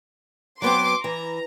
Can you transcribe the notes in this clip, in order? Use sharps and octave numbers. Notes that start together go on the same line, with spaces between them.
F#3 B3 C4 C6 D6
E3 A#5